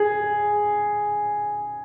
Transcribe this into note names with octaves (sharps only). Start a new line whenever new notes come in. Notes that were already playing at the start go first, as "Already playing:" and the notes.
Already playing: G#4